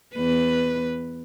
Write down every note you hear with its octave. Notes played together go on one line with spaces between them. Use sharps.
E2 B4